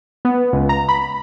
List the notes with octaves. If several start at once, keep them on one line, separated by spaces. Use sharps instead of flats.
B3
C#2
A#5
B5